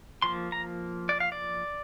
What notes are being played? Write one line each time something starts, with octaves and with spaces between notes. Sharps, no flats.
F3 A#3 C6
A#5
D5
F5
D5